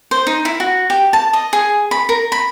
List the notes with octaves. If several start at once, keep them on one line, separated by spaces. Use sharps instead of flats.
C5
D#4
E4
F#4
G4
A5
D#5
G#4
B5
A#4
B5